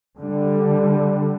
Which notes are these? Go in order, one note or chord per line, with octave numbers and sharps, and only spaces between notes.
D3 G3